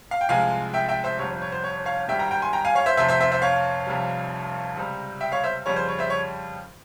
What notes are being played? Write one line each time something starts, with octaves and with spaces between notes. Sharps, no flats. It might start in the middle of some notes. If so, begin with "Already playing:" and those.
F5
G5
C2 C3 F3 G#3 F5 G#5
E5 G5
E5 G5
C5 E5
G1 F2 C3 G3 C#5
C#5
C5
C#5
C#5 F5
G#1 G2 G3 E5 G5
G5 A#5
G5 A#5
G#5 C6
G5 A#5
F5 G#5
C#5 F5
C5 E5
F1 F2 C3 C5 E5
C5 E5
C5 E5
C5 E5
C#5 F5
F1 F2 C3 G3
C#2 C3 G3
E5 G5
C#5 F5
C5 E5
F2 C#3 G3 C#5
C5
C#5
C5 E5
C#5